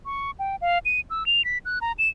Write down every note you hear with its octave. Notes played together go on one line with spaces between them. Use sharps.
C#6
G5
F5
D#7
E6
F7
B6
F#6
A#5
E7